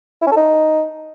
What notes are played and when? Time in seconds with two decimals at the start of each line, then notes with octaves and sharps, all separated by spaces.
0.22 E4
0.27 C#4
0.32 A4
0.37 D#4